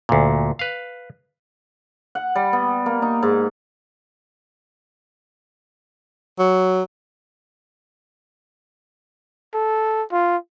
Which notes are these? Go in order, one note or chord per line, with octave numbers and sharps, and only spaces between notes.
D2 A#2
B4 F5
F#5
G3
B3
A#3
D#4
G#2
F#3
A4
F4